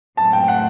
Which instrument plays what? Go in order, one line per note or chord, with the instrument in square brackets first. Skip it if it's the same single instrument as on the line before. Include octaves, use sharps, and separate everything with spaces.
[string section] A2 F#3 C4 [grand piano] A5
[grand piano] G5
F#5